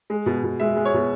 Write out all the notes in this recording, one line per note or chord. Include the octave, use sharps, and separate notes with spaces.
G#3
B2
B2
G#3 E5
G#3
C#5
B2